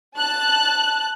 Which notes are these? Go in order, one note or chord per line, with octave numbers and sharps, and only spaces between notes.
A5 F#6